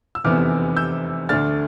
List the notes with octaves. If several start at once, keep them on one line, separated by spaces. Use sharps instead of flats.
E6
F1 E2 C3 E3 B3 D6 F6
E6 G6
D2 D3 A3 D4 F6 A6